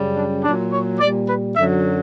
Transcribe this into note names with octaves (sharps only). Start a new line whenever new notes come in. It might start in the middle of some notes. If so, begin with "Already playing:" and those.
Already playing: F#2 C#3 G3
D4
A#2 F#3 D4
C#5
A#2 G3 D5
B4
F#2 D3 F#3 E5